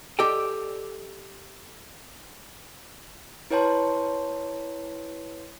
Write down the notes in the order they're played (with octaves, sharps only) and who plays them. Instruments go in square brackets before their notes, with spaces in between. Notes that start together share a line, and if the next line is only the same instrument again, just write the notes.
[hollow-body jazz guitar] G4 A4 D5 D#5 G5
[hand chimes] E4 B4 C#5 G5 A5 C6